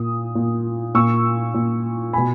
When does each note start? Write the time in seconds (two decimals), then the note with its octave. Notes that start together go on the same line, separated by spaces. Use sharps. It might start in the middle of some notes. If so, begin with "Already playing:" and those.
Already playing: A#2 D#6
0.35 A#2
0.94 A#2 C#6 E6
1.54 A#2
2.13 B2 G#5 B5